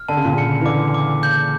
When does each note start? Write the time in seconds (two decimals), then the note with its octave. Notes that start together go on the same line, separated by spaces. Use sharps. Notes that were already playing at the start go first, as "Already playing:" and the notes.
Already playing: F6
0.09 D3 A5
0.17 C#3
0.25 A#2
0.33 C#3 C#7
0.61 E3
0.66 D3 D6
0.94 D6
1.23 G6